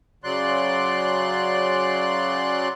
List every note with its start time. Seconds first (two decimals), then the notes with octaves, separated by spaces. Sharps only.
0.24 C#3 F#3 D5 C6 F#6